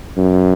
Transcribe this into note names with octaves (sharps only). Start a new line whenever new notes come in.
F#2